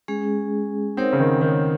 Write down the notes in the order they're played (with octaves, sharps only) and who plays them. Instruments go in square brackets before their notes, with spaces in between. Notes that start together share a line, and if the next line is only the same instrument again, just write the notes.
[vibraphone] G#3 C#4 G#4
[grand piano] C4 [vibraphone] D#4 A#4 C#5 F#5
[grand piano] C#3
D#3
D#3